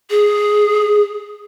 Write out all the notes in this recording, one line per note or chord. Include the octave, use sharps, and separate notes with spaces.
G#4